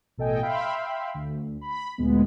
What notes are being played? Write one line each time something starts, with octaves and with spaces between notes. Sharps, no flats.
A1 B2 A4 D#5 G5 G#5
E5 F5 G5 B5 C6
D2
B5
D2 A#2 G#3 B3